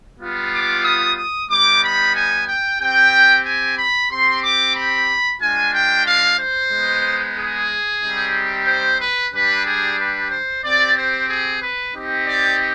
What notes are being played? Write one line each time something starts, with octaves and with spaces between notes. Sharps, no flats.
G3 B3 F4
D6
D#6
D#6
G3 B3 D#4 D6
B5
G#5
G5
C4 G4 G5
G#5
B5
C4 G4 C6
D6
B5
G#3 D4 F4 G#5
G5
F5
C5
G#3 B3 D#4
G#4
G3 C4 D#4 G4
C5
B4
G3 D4 G4 B4
G#4
B4
C5
C4 G4 D5
C5
G#4
B4
C4 D#4 G4
D5